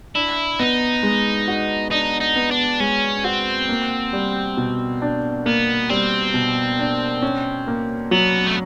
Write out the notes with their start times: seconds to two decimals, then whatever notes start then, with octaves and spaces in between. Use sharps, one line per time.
0.15 D4 E4
0.60 B3 D#4
1.03 G#3
1.48 F#4
1.91 D4 D#4
2.21 D#4
2.36 B3
2.51 D4
2.80 G#3 C#4
3.24 C4 F#4
3.69 A#3
4.13 G3
4.57 B2
5.02 D4
5.46 A#3 B3
5.89 G3 C4
6.34 B2
6.79 D4
7.22 C#4
7.67 A#3
8.11 F#3 B3
8.47 A3